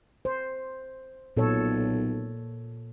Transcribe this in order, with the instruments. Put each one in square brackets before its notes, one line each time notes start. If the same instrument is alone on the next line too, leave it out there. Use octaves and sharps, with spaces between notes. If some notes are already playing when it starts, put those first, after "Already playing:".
[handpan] C5
[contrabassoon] B1 [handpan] A#2 A4 C#5